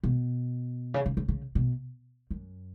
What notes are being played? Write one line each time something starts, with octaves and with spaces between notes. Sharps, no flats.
B2
C#3
C#3
C#3
C#3
B2
F#2